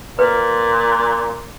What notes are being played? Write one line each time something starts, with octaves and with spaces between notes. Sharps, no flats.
A#2 B4